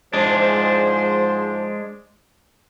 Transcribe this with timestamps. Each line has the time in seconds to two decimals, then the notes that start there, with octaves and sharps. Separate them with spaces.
0.13 G#2 F3 G#3 D4 C5